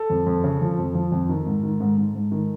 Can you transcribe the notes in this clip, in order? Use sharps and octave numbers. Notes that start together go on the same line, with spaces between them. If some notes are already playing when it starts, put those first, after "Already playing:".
Already playing: A4
F2
F2
C#3
F3
F2
F3
F2
D#3
G#2
D#3
G#2
G#2
G#2
D#3